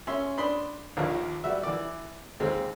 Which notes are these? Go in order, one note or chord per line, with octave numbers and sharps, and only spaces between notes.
C#4 E5 C6
D4 B5 C6 D#6
A#1 D#2 A#2
G3 F#4 E5
E3 D5
D#2 G#3 C4